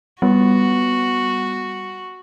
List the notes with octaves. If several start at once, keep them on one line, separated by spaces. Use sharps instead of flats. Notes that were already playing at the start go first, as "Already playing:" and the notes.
G3 B3 F#4